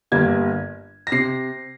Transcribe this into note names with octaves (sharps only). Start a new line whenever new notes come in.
G1 G2 G3 A#3 G#6
A#6
C3 C7